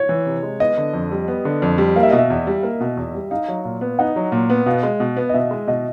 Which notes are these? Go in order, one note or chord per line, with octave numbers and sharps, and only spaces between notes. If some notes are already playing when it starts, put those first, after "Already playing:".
Already playing: C#5
E3
C3
G#3
B3 D#5
D3
F2
G3
B3
D3
F2
G3
A#3 F5
E5
B2 D#5
E5
E2
G3
A#3
B2
E2
G3
D#4 F5
F#3
A#2
B3
D#4 F#5
F#3
A#2
B3
B2 F5
G#3
B2
B3
D#5
B2 E5
G#3
B2 D#5